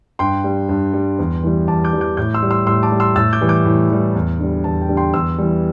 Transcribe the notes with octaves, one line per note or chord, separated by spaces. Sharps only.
G2 G5 C6
G3
G2
G3
E2
E3 G3
E2 A5 D6
D6 G6
E3 G3
D6 G6
A2 D6 G6
C6 E6
G3
C6 E6
A2 C6 E6
A5 D6
G3
C6 E6
A2 E6 A6
D6 G6
E3 G3
D6 G6
A2
E3 G3
E2
D3 G3
E2 A5
G5
D3 G3
G5 C6
E2 C6 E6
E3 G3